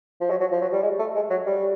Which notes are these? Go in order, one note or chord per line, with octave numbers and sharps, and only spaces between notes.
F3
F#3
F#3
F3
F#3
G3
G#3
A3
G#3
F#3
G3